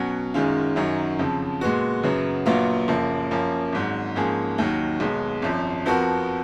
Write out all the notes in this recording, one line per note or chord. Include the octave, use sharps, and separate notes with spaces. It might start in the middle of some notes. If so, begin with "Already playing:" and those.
Already playing: B2 F#3 C#4
F#2 D#3 G#3 C#4 F4
F#2 D#3 F#3 C#4
F2 C#3 F3
A#2 G#3 B3 F#4
F#2 C#3 F#3 B3
A#1 A#2 F#3 B3 F4
F#1 F#2 F3 A#3
F#2 F3 A#3 C#4
G#1 G#2 F#3
G#2 F3 A#3 C#4 G#4
D#2 D#3 F#3
B1 B2 G#3
G#1 F#2 F3
F2 F3 B3 F#4 A#4